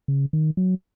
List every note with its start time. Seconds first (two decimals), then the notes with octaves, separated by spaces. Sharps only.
0.08 C#3
0.33 D#3
0.57 F#3